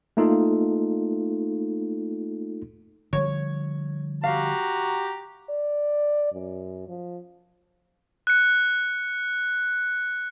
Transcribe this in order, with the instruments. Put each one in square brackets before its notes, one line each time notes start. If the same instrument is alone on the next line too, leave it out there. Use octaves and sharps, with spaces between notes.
[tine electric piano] A3 A#3 D#4 F4 A4
[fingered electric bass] D3 F3 G3 [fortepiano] C#5
[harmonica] F#4 G4 A#5 [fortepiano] F5
[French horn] D5
F#2
F3
[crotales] F#6 C#7